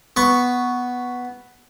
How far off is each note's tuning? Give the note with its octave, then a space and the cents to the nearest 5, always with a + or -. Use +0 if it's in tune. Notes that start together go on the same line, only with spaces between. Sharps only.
B3 +0 C#6 +0